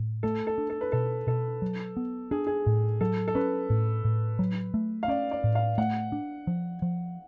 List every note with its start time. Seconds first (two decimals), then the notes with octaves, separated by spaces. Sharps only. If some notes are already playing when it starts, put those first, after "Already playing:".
Already playing: A2
0.23 A3 A4
0.47 A4
0.58 D4
0.70 A4
0.81 B4
0.92 B2 A4
1.27 B2 A4
1.62 F#3
1.97 B3
2.31 D4 G#4
2.47 G#4
2.66 A2
3.01 F#3 A4
3.28 A4
3.35 C#4 B4
3.70 A2
4.05 A2
4.39 F#3
4.74 A3
5.03 F5
5.08 C#4 D5
5.31 D5
5.44 A2
5.55 F5
5.78 A3 F#5
6.12 D4
6.47 F3
6.82 F3